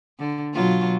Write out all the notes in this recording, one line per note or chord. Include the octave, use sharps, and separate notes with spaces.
D3
B2 F#3 F4